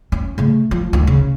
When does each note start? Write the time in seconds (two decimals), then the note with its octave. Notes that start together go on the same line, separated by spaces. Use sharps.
0.12 C#4
0.38 C#3 A3
0.71 F3
0.93 D2 D#3
1.07 C#3